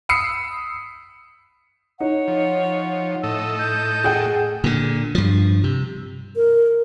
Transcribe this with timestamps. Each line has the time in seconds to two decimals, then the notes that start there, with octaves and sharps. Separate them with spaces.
0.09 B5 D#6 E6 C7 C#7
2.01 D#4 C#5 F#5
2.28 F3
3.23 A2 A4 D#5 E6
3.58 G6
4.04 G#4 F#5 G5
4.64 A#2 D3
5.15 G2 F3
5.64 C3
6.36 A#4